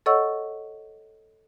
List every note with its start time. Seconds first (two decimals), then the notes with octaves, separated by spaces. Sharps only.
0.06 A4 C#5 D#5 F#5 C#6 E6